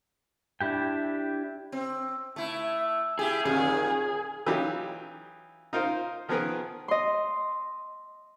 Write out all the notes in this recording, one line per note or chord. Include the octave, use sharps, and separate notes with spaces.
D4 E4 G4 G5
C4
A3 E4
E4 G4 G#4
F2 A#2 D#3 G#4
E3 F#3 D#4 F4 G4
D#4 F4 A#4 C5
D#3 F3 B3 G#4 A#4 B4
D#5 C6